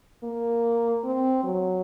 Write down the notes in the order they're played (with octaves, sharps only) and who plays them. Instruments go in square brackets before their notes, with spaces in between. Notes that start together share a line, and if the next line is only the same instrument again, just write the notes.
[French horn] A#3
C4
F#3